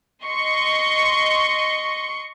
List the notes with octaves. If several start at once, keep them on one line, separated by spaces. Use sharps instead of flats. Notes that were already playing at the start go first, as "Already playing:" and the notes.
D#5 C6 C#6